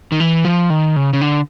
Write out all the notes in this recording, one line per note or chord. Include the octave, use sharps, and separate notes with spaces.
D#3
E3
F3
D#3
C#3
C#3
D3